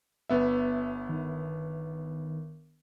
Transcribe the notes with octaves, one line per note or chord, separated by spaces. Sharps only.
G1 B3 E5
D#3